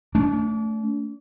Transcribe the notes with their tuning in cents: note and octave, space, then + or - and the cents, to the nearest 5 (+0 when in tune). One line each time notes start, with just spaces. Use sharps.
A3 +0 D4 -40